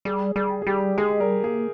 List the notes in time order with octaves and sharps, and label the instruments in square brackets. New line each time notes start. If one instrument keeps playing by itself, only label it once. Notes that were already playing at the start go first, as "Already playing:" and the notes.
[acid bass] G3 [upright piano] G#4
[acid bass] G3 [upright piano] G#4
[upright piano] G#4
[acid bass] G3 [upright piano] G4
[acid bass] G#3 [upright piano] G#4
[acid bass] G3 [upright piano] A#4
[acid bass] A#3 [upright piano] G#4